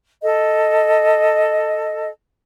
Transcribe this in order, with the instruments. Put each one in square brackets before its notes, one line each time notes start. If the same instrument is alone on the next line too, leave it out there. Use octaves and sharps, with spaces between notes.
[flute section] A4 D#5